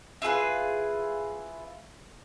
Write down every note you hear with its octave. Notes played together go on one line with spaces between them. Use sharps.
E4 F4 G#4 B4